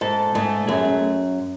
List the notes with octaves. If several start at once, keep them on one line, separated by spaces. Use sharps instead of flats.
G#2 A4
G#2 A3
F#2 G#4